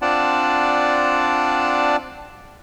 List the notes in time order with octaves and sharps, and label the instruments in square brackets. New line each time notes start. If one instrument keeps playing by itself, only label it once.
[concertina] C4 D4 F4 D5 F#5 A5